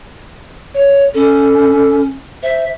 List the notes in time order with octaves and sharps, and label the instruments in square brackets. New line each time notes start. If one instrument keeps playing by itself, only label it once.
[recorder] C#5
[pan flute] C#4 [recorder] A4
[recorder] C5 [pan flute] E5